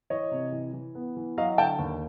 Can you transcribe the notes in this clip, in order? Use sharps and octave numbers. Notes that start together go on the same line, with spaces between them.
E3 C#5 D#5
C3
E3
E3
B3
E3
F#3 D#5 F5
D3 G5 A5
D#2